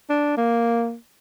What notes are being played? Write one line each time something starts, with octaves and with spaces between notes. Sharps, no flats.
D4
A#3